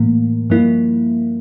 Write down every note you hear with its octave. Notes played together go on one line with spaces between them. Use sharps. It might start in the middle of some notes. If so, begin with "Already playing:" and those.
Already playing: A2 E3 A#3
G2 F3 A#3 E4